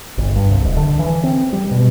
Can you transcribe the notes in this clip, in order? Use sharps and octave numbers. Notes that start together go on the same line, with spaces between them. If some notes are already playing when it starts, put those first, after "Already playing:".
G1
G2
C2
D1
D3
E3
C4
G3
B2